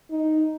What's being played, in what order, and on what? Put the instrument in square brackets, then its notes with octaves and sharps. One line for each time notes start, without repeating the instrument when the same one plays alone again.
[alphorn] D#4